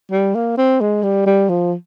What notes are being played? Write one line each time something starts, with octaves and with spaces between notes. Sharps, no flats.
G3
A#3
C4
G#3
G3
G3
F3